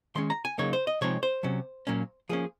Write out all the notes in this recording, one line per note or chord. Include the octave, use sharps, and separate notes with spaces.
D#3 G#3 C#4 C6
A#5
G#5
C#3 F#3 A#3 D#4 C#5
C5
D#5
C3 F3 G#3 C4 D#4 C#5
C5
C3 F#3 C#4
A#2 F#3 A#3 C#4
F3 A#3 C#4 G#4